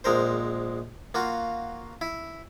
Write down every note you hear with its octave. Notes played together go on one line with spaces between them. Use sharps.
A#1 G#3 A#4 C5
A#3 F4 F#4
E4